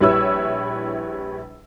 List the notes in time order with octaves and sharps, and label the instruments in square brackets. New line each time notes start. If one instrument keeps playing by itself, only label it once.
[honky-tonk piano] A#1 G3 E4 B4 C#5 E6